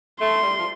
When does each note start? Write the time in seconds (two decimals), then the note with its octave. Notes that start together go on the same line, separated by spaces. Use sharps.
0.20 A3 C6
0.42 G3
0.58 F3